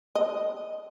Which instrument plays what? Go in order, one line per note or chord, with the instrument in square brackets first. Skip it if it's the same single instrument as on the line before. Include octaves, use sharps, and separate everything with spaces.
[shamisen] D#5